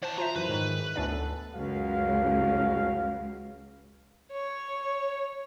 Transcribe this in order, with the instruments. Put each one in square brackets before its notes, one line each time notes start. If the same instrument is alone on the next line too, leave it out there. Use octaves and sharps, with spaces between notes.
[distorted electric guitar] E3 A5 [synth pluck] C5 [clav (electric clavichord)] F#5
[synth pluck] F4 C5 E5 [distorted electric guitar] A#5
[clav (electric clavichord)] F#2 E3 [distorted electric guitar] B4
[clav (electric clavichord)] G#2 D#3 C#5
[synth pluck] D2 D4 D5 [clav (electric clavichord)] B3 C#4 E4
[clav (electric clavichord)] B3 A4
[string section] C#2 [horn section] F#2 F#4 F5
[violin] C#5